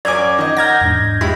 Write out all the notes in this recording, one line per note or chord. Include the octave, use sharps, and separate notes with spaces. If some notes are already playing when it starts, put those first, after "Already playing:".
F#2 C#4 D5 G#5 D6 G#6
D#3 D#5
F#5 A#5 F6 G6 G#6 A#6
E2 G#2 D4
G#3 E4 G4 B5